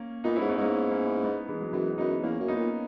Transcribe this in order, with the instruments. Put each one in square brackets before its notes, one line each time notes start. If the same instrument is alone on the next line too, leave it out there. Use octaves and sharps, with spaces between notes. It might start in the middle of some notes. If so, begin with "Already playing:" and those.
Already playing: [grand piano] A#3 C#4
[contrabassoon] A#2 [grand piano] B3 D#4
[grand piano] C#4 E4
[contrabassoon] G#2
[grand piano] B3 D#4
[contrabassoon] G#2 [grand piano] A#3 C#4
[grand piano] A#3 C#4
C#4 E4
B3 D#4
E3 G#3
F#3
[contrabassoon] F#2 [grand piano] E3 G#3
[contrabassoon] F#2 [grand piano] B3 D#4
[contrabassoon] E2 [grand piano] A#3 C#4
[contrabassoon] F#2
[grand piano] B3 D#4
[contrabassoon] A#2